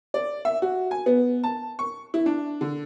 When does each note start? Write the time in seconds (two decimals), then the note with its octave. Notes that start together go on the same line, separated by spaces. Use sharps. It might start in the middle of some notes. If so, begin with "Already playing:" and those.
0.14 D5
0.45 E5
0.62 F#4
0.91 G#5
1.06 B3
1.44 A5
1.79 C#6
2.14 E4
2.26 D4
2.61 D3